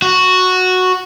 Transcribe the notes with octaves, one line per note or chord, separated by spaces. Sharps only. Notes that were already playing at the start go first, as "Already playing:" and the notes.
F#4